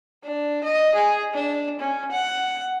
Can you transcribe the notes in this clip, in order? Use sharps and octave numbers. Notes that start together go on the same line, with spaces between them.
D4
D#5
G#4
D4
C#4
F#5